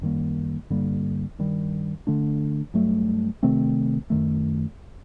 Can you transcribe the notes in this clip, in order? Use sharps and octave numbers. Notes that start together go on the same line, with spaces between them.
F#2 D#3 G3 A#3
G2 D3 G3 A#3
G2 D#3 G3
D3 A3 D4
G2 F#3 A3
C3 D#3 A3 C4
F#2 D#3 A3